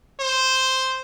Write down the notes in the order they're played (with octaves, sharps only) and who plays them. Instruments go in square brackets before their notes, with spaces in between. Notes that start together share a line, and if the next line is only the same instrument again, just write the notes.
[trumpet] C5